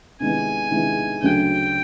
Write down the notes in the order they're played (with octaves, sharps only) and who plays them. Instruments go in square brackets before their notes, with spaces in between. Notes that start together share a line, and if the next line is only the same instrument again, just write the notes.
[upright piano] C3 D#3 G#3 B3 E4 [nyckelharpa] G#5
[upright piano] C3 D#3 G#3 B3 E4
[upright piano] D2 C#3 F#3 A3 [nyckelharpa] G5